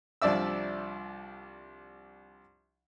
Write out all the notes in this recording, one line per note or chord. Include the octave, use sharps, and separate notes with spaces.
C2 F3 D4 D5 E5 E6